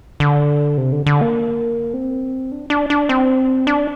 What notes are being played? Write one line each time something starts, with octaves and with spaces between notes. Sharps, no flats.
D3
C3
D3
D3
A#3
C4
D4
D4
D4
C4
D4